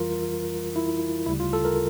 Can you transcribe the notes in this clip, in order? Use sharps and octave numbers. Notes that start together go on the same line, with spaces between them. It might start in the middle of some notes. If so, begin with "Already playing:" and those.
Already playing: F2 E3 G3 F4 A#4
E4
D2 C#3 G3 E4
F4
A4
A#4